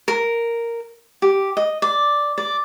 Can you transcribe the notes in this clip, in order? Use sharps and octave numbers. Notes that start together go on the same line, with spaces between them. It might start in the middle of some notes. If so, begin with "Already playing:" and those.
A#4
G4
D#5
D5
D5